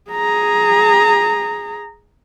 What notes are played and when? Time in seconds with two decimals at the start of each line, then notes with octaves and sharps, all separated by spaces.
0.11 G#4 A#5